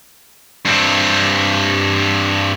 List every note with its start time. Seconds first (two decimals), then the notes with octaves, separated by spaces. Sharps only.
0.65 G2 C4